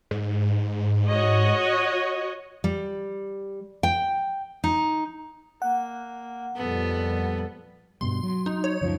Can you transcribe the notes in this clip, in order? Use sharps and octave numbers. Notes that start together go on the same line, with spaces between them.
G#2
F#4 C#5 D#5
G3
G5
D#4
A#3 F#5
F2 A#2 G3 B3 A4
G2 B2 G3 C6
F#3
D#4
C#5
C#2 F#2 F3